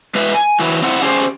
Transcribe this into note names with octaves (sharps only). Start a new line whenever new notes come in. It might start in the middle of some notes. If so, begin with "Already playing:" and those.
G#3 B4 E5
G#5
E3 F#3
C4 E4 F#5
C#4 G4 G#4 C5